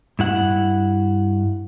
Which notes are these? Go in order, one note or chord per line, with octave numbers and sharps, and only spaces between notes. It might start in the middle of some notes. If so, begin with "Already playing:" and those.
G2 E4 F#5